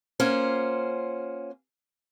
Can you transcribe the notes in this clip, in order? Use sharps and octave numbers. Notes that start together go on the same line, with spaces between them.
A#3 C#4 F4 C5 F#5